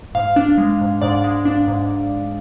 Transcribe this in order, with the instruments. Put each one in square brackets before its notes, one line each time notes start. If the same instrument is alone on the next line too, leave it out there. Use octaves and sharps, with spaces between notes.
[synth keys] G#2 F5
D4
G#3
G#2
G#2 D5
G#3
D4
G#2